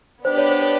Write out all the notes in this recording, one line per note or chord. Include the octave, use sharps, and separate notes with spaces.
B3 D4 G4 B4 C5
C#5
C5
C#5